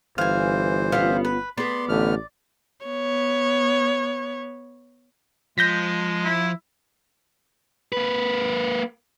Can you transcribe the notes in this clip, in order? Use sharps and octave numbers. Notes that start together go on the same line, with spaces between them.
G1 E3 C5 F5 G#5
B3 C#4 F4 F5
B4
B3 G#4 D5 C6
A1 D3 A3 F6
B3 C#5
F3 G#3 G6 A#6 B6
E4
A#3 B4